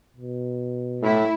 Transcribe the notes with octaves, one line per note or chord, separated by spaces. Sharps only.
B2
A2 A3 E4